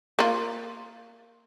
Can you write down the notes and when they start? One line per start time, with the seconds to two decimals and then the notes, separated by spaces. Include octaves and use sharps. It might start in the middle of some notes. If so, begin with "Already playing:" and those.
0.19 A#3 F4